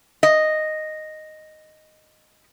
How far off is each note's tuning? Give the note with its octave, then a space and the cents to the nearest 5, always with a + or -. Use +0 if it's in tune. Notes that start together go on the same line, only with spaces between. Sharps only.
D#5 -5